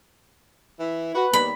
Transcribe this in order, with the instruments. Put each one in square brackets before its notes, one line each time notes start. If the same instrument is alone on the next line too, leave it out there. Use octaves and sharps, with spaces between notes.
[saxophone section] E3 E4
[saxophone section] F#4 [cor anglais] B4
[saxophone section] D#2 G3 B3 [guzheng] B5